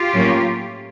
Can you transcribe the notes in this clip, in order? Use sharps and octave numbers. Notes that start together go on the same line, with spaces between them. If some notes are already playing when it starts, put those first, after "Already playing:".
Already playing: F4 G4
A2 F#3 A#3 C#4